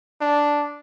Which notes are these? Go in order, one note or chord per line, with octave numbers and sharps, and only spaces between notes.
D4